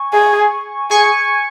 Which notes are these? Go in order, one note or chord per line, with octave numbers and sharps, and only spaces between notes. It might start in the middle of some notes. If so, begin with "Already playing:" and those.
Already playing: G#5 C#6
G#4
G#4 G#5 C#6